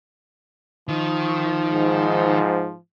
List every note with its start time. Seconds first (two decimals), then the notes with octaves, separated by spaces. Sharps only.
0.88 D#3 F3
1.72 G#2